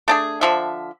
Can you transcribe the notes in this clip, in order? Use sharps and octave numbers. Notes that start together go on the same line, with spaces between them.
A3 D4 G#4
D3 F3 E5